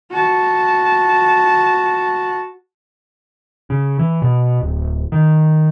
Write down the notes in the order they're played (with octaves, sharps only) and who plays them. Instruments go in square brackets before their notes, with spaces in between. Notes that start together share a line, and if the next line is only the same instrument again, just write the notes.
[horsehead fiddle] F#4 A5
[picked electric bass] C#3
E3
B2
D1
D#3